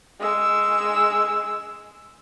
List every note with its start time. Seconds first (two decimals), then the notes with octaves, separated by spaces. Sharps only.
0.20 G#3 E6